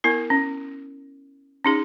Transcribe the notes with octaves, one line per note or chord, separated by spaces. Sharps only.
B3 E4 A#4
C#4
C#4 D#4 G#4